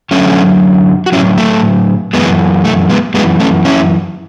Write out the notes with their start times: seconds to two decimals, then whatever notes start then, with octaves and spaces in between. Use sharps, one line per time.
0.11 F#2 D3 F#3 A3 C#4
1.06 F#4
1.12 A2 F#3 C#4 E4
1.38 A3
2.13 F#2 E3 G#3 B3
2.65 A3
2.89 G#3 B3
3.14 F#2 E3 G#3 B3
3.40 A3 C#4
3.65 C#4 E4